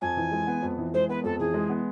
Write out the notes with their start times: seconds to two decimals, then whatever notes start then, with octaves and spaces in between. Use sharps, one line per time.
0.01 F2 G#5
0.17 E3
0.32 G#3
0.47 B3
0.62 F2
0.78 E3
0.94 G#3 C5
1.09 B3 B4
1.24 F2 A4
1.39 E3 G#4
1.54 G#3
1.70 B3